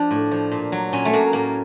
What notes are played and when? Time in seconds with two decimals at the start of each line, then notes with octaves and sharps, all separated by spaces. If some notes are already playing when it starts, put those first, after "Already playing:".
Already playing: F3 D4
0.11 A2
0.31 F3
0.52 A#2
0.72 F#3
0.93 A#2 C#4
1.05 A3
1.13 F#3 A#3
1.32 A2 A#3